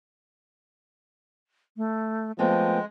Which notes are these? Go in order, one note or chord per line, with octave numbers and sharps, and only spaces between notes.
A3
F3 G#3 A3 B3 C4 G5